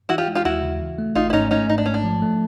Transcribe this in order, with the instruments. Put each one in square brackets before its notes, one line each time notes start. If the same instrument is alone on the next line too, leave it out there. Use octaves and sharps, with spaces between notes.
[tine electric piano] E3 [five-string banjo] E4 F#4
[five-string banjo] F4 G4
[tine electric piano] G#3
[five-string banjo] F4 G4
[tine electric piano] D#2 [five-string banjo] E4 F#4
[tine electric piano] C#3
E3
A3
[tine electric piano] G#1 [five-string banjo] D#4 F4
[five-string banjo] E4
[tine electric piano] G#2 [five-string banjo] C#4 D#4
[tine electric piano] A3 [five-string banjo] C#4 D#4
[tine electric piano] G#2 [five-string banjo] D#4
[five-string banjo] D4
[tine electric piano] G#2 [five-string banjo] C#4
[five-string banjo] D4
[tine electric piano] F3
A3